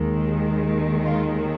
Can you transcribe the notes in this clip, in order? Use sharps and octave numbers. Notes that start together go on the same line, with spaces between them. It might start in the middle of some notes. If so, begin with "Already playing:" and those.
Already playing: D#2 D#3 G#3
F4